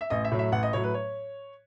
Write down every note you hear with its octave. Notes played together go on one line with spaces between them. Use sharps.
E5
A1 D#5
E5
A2 F#3
E5
A1 F#5
D#5
A2 F#3 C#5
B4
C#5